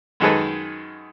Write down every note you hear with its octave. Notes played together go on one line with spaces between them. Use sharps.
F#2 D#3 G#3 G#4 A4 B4